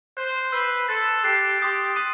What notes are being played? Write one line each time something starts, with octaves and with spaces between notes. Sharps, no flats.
C5 F#6 B6 D#7 G7
B4 E6 G6 C7
A4 C6 F#6 A6
G4 F#6 A6 C7 E7
G4 C6 D#6 A6
C6 D#6 F#6 B6 D#7